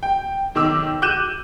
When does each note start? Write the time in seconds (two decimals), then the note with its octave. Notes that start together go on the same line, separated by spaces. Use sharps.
0.03 G5
0.55 B1 D#3 D6 E6
1.02 D6 F#6 G6 D#7 E7